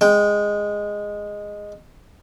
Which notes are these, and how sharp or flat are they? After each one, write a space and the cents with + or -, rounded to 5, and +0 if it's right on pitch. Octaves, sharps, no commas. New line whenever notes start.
G#3 -10 G5 +0